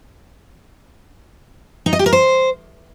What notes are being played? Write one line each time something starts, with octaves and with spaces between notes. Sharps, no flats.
D#4
D#5
G4
A#4
C5